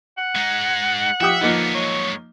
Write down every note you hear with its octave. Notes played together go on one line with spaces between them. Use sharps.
F#5
G#3 D#4
F3 G4 E5 D#6
D3 F3 A#3 B3 D#4
F#3 G#3 C#5